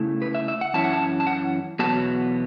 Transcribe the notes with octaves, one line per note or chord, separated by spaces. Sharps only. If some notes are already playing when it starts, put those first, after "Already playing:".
Already playing: C#3 A3 E4
B4
E5
E5
F#5
F#2 E3 C#4 E4 A5
F#5
A5
A5
F#5
E2 B2 F#3 B3 A5